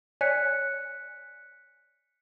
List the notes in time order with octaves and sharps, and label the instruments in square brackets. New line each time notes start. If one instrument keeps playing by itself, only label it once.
[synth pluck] C#5 D5 G#5 [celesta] F#6 B6 C#7